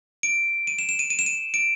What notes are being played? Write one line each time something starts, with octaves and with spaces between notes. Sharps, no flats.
D7
D#7
E7
E7
D#7
D#7
E7
D#7
D7